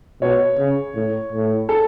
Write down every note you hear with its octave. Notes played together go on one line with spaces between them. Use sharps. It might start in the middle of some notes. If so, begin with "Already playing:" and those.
B2 C#5
C#3
A2
A2
A4